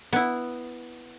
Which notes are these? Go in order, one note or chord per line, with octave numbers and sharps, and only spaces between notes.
B3 E4